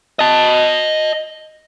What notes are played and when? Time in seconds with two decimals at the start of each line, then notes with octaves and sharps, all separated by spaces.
0.19 D#5 A5